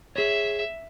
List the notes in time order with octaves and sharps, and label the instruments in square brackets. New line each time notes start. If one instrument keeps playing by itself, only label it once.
[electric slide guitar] G#4 C#5 [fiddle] E5